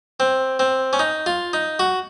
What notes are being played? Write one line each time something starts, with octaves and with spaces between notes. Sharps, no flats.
C4
C4
C#4
D#4
F4
D#4
F#4